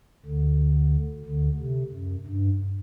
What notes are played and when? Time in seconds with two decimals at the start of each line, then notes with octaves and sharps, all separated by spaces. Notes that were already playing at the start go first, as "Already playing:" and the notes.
0.26 D2 D3
1.25 D2 D3
1.59 C3
1.93 F#2
2.26 G2